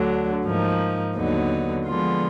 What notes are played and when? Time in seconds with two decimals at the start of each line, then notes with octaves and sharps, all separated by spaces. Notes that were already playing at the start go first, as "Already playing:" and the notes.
Already playing: D2 D3 F#3 D4
0.44 G#2 F3 A#3 D#4
1.16 D#2 D3 F#3 B3 D#4
1.87 D3 F3 G#3 B3 F4